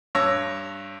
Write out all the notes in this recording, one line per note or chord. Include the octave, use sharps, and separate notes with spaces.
G2 C#5 E6 A#6